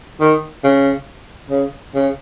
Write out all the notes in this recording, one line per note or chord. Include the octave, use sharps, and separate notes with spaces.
D#3
C#3
C#3
C#3